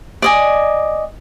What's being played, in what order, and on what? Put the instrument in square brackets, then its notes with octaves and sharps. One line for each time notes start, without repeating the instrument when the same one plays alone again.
[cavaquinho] D5 D#5 G#5